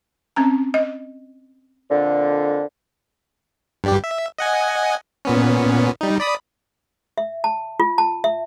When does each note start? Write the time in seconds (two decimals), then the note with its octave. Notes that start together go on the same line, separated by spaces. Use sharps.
0.36 C4 C#4 A#5
0.74 D#5
1.91 F2 A#2 D3
3.84 G2 G3 G4
4.04 E5
4.38 D#5 F#5 G#5
5.25 A#2 B3 C#4
6.01 G3 D#4
6.20 D5 B5 D#6
7.18 E5
7.44 A5
7.80 F4
7.98 A5
8.24 E5